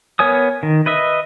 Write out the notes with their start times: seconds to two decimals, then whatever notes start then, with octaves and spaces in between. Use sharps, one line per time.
0.19 B3 A#4 C#5 G#5 D#6
0.63 D#3
0.86 B4 D#5 E5